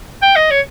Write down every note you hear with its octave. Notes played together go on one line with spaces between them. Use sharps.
G5
D#5
C#5